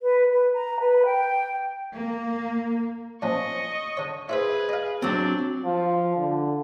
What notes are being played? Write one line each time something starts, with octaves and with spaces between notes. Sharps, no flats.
B4
B4
A#5
B4
G5
A#3
A#2 F3 C#4 D#5 C#6
D3 C#5
E4 G#4 B4 C5 E5
D#5 F5
F#3 C4 D4 D5
F3
D3